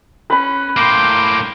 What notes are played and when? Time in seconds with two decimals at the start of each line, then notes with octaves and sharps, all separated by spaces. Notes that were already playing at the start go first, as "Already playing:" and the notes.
0.30 C#4 B4 B5
0.77 A2 A#3 G5 C6 D6